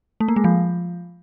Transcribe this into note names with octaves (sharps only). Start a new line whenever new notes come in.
A3
A#3
G#3
F3